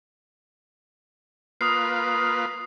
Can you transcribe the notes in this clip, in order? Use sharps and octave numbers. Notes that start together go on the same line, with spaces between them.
A#3 F4 B4 D#6 C7